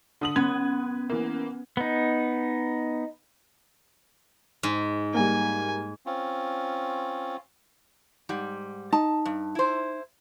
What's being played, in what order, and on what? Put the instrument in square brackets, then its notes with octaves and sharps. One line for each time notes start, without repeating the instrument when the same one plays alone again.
[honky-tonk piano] D3 D#6 F#7
[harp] B3 [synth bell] C#4 [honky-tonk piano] G#6
[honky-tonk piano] E3 A#3
[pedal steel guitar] B3 D#4
[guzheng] G#2
[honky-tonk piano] G3 A#3 [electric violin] G#5
[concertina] C4 C#4 F4
[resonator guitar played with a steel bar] G#2 G3
[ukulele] D#4 [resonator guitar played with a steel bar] A5
[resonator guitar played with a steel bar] G2
E4 C5